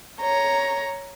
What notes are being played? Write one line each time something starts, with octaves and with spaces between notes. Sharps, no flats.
C#5 A#5